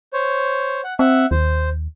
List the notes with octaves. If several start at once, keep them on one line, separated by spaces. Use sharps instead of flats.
C5 C#5
F#5
C4 E5 F#5
D#2 C5